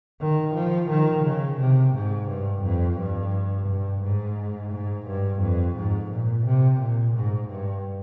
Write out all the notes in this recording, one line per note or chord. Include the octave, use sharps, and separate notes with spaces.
D#3
F3
D#3
C#3
C3
G#2
G2
F2
G2
G2
G#2
G#2
G2
F2
G#2
A#2
C3
A#2
G#2
G2